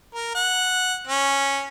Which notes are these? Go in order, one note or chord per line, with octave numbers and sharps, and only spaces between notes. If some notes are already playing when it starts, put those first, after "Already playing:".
A#4
F#5
C#4